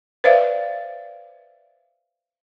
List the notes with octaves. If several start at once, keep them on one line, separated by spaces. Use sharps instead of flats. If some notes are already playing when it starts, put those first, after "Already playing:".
B4 C5 D5 E5 F5